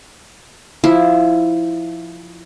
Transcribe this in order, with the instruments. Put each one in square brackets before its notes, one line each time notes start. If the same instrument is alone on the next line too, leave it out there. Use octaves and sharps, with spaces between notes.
[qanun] F3 E4